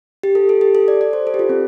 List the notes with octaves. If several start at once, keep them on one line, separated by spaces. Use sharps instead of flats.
G4
A4
A4
G4
A4
D5
D5
C5
A4
G4
F4
C4